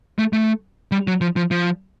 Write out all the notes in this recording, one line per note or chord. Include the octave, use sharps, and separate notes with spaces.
A3
A3
G3
F#3
F3
F3
F3